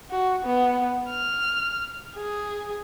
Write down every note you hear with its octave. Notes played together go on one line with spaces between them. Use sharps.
F#4
B3
F6
G#4